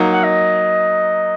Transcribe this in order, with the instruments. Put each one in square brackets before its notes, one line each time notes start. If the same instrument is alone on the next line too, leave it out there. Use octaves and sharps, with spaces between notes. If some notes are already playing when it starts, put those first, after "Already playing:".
Already playing: [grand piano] F#3 A#3 D#4
[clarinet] F#5
D#5